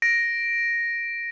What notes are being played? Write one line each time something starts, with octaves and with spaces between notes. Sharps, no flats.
A#6 D7